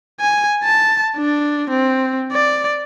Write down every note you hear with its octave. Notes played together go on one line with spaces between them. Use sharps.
G#5
A5
D4
C4
D5